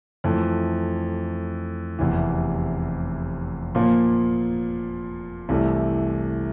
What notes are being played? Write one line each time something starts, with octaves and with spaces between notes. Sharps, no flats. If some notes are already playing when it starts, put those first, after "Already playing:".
F2 E3 A3
F1 E2 C3 E3
A#2 F3 A#3
C2 C3 E3 A3